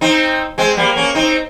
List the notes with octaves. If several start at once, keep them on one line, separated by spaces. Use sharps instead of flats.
C4 D#4
G#3 C4
G3 A#3
A#3 C#4
C4 D#4